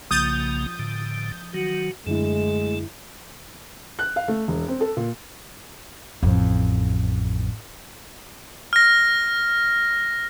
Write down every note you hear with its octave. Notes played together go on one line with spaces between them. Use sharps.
B1 C#3 F3 A#3 D#6 G6 A6
A2 D3
D#3 F#3 F#4
F#2 D3 G#3 A3 E4
F#6
F5
A3
E1
C4
A4
A#2
A1 F2
F6 A#6